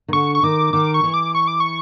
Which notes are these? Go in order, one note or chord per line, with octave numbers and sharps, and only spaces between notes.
D#3
D3 C#6
C#6
D#3 D6
D#3 D6
C#6
E3
D6
C#6
D6
C#6